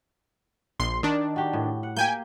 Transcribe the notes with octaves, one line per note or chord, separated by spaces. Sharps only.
A#1 C6
D#3 D4
F#4 G4
A2
F#5
A#3 G4 G5 G#5 G6